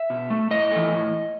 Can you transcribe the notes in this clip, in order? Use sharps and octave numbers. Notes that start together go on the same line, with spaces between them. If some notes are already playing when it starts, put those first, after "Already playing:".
Already playing: E5
B2
A3
A2 D#5
E3 A3
A2